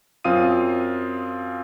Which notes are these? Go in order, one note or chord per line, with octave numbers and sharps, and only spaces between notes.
F#2 C4 F4 F5 D#6 D#7